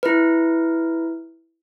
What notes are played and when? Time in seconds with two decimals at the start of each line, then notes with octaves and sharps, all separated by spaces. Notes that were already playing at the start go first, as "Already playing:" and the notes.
0.03 E4 B4